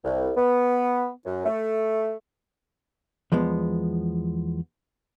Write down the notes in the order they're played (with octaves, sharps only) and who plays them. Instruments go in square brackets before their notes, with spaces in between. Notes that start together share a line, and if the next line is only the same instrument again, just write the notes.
[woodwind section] C2
B3
F#2
A3
[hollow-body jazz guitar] E2 F3 G#3 B3